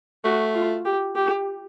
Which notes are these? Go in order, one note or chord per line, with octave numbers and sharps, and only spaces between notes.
A3 F#4
F4
G4
G4